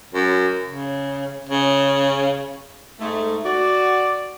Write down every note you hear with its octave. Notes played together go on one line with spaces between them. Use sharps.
F#2
C#3
C#3
G#2 A3
F#4 D5